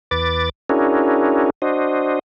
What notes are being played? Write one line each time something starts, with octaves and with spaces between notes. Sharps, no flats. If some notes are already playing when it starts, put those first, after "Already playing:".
E2 B4 D6 A6
C#4 D4 E4 F#4 G#4 A#4
D4 F#4 C5 D#5